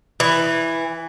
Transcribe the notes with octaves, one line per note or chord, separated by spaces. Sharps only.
E3